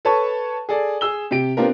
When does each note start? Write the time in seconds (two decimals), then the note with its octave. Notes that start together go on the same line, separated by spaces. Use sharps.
0.05 A4 B4 C#5 A5 C#6
0.69 G#4 A4 D5
1.01 G#4 E6 G7
1.31 C3 G4 D7
1.57 B3 C4 D4 F4 G4 A#4